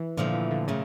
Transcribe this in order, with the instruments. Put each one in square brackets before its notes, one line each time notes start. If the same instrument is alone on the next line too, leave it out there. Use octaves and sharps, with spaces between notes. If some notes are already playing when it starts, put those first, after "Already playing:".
Already playing: [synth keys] E3
[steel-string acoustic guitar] A#2 F3 A3 [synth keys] D3
[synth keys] E3
D3
[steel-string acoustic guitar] A#2 F3 A3 [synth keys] C#3